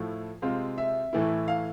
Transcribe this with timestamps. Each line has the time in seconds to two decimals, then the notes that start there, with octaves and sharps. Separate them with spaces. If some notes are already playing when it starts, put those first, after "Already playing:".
Already playing: A2 F3 A3 E4
0.42 C3 G#3 C4 F4
0.78 E5
1.13 A2 E3 A3 E4
1.48 F5